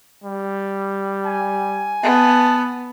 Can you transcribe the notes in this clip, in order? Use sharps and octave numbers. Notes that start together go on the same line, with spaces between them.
G3
G#5
B3 A5